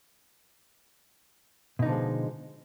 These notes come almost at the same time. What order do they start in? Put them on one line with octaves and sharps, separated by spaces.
B2 D#4 D3 F3 G#3